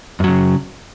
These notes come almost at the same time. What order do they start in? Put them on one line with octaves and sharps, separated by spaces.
F#2 F#3 C#3